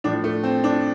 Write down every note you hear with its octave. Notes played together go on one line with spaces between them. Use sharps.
A2 F3 D4
A3
C4
D4